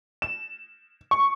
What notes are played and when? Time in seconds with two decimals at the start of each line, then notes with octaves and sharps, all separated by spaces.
0.22 E7
1.11 C#6